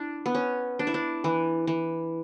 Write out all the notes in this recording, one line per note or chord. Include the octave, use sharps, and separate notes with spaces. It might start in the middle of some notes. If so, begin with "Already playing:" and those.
Already playing: D4 E4
B3
C#4
D4
E4
D4
E3
E3